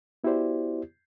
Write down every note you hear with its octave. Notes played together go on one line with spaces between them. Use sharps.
B3 E4 F#4 G4 C5 D5